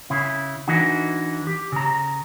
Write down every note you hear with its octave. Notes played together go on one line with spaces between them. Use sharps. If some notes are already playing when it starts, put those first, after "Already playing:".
C#3 E4
E3 D4 D#4 F#4
G4
C#3 A#5